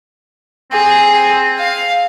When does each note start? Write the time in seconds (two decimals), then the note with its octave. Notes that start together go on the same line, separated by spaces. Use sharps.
0.72 C4 G#4
1.58 F5